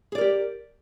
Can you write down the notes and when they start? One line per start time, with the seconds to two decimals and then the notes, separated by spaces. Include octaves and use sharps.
0.12 G#4
0.15 D5
0.18 A#4
0.21 G4